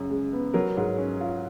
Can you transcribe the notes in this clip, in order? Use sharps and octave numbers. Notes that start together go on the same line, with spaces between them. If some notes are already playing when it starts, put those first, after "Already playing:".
Already playing: F#2 C#3
G#3
B3
F#3 A#4
G#2
C#4
F4